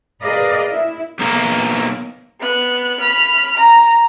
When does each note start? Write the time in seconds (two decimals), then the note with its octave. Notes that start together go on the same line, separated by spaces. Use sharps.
0.22 G#4 A#4 B4 D5 D#5 F5
0.70 E4
1.19 B1 A#3
2.40 B3 F#6
3.01 B5 F6
3.57 A#5